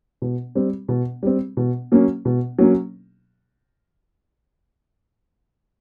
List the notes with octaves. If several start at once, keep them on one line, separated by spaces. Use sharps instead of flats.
B2
G3 C4
B2
G3 C4
B2
F#3 A#3 C#4
B2
F#3 A#3 C#4